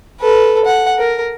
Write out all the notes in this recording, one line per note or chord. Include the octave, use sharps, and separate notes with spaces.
A4 B4
F#5
A#4